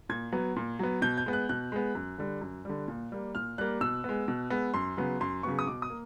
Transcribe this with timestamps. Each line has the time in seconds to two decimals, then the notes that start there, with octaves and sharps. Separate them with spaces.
0.09 A#2 G#6
0.32 F#3 B3
0.56 A#2
0.79 F#3 B3
1.02 B2 G6
1.17 G6
1.26 G#3 B3
1.33 F#6
1.49 B2 F#6
1.72 G#3 B3
1.95 F#2
2.18 D3 G3
2.41 F#2
2.65 D3 G3
2.88 A#2
3.12 G3 A#3
3.35 A#2 F6
3.58 G3 A#3 F#6
3.81 B2 E6
4.04 G#3 B3
4.28 B2
4.50 G#3 B3
4.74 F#2 C6
4.97 C#3 F#3 B3
5.21 F#2 C6
5.43 C#3 F#3 B3 C#6
5.59 D#6
5.67 B2 D6
5.82 D#6
5.90 A#3